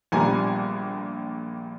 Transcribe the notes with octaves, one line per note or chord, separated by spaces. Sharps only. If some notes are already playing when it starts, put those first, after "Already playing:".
A#1 A#2 G3 B3 G#5 A#5